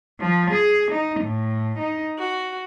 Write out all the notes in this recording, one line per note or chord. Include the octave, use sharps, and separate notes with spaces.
F3
G#4
D#4
A2
D#4
F#4